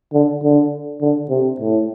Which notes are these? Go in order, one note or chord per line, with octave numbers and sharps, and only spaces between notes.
D3
D3
D3
C3
A2